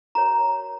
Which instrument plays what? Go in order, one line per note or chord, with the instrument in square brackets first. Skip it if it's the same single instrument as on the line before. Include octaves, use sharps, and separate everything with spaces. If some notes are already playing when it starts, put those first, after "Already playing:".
[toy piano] F#4 A#4 C#5 A#5